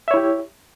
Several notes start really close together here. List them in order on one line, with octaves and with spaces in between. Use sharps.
E5 C#5 E4 G4